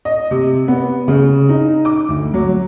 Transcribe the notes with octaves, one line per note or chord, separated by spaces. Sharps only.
D#5
C3
B3
C#3
D#4
D6
D2
F#3